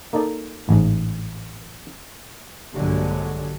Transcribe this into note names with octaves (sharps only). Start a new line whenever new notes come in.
A#3 D#4 A4 D5
A1 G#2
A#1 G2 D3 F#3 G#3